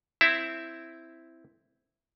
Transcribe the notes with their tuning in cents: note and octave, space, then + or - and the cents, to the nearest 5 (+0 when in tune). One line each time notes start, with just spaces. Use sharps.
C4 +0 E4 +0 E5 +0